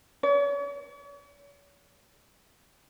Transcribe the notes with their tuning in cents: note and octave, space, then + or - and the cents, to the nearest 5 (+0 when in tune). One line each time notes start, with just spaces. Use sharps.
C#5 +40